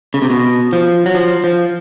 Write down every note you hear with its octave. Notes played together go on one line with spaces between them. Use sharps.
C#3
C3
B2
F3
F#3
F3
F3